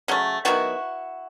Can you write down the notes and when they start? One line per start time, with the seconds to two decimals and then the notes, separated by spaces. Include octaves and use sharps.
0.08 C#3 F#3 A3
0.45 D#3 F#3 B3 E4 F#4